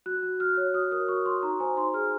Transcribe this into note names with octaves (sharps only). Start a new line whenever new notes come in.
F#4 F#6
F#4
F#4 F6
C#5
F#4 D#6
A#4 D#6
F#4 C#6
F#4 C6
D#4 A#5
C5 G#5
D#4 C6
G#4 F6